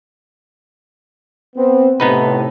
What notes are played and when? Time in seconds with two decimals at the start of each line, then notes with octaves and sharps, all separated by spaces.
1.56 B3 C4
2.00 A2 C3 B3 D#4 B4